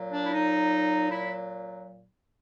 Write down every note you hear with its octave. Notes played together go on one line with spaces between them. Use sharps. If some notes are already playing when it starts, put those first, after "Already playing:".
Already playing: A#2 F#3
D4
E4
D#4
E4